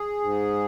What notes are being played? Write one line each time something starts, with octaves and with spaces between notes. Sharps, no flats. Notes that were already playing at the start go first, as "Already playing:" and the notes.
Already playing: G#4
G#2